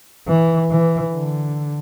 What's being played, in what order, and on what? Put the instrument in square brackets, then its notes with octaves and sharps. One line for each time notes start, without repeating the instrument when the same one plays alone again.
[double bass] E3
E3
D3